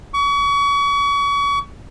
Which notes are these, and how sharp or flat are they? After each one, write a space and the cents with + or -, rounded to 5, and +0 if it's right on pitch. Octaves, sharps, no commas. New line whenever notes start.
C#6 +35